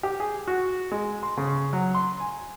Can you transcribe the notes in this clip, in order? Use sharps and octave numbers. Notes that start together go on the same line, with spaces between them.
G4
G#4
F#4
G#3
C6
C#3
F#3
C6
G#5